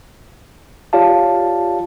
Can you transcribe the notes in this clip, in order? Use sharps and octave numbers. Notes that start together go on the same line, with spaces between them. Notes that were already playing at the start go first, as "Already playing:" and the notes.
F4 G4 C#5 D5 F5 A5